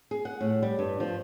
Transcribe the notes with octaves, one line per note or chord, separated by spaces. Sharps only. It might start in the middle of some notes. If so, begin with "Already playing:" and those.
G#4
F#5
A2
G3
G2
F3